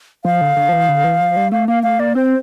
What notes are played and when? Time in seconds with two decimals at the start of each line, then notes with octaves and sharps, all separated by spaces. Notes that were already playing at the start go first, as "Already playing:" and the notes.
0.25 F3 F5
0.41 D3
0.56 D3
0.69 F3
0.73 E3
0.88 D3
1.04 E3
1.20 F3
1.36 G3
1.52 A3 F5
1.68 A#3 F5
1.83 A3 F5
1.99 A#3 D5
2.15 C4 C5